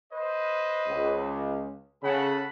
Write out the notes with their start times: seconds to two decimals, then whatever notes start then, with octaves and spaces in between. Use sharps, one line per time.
0.12 B4 C5 D#5
0.86 C#2
2.03 C#3 A4 F#5 B5